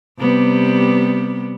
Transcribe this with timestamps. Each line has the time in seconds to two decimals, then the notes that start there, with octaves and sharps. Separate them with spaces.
0.19 C3 G3 B3